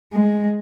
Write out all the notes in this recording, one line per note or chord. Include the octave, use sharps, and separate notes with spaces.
G#3